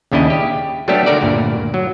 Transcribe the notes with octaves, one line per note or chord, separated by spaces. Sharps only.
D#2 C#3 D4 E4 D#5
G4
F#3 G3 A3 B3 D4 G4
D3 F#4 A#4 D5
D2 G2 A#2
F#3